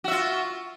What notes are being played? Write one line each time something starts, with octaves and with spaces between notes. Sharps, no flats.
F4 F#4 E5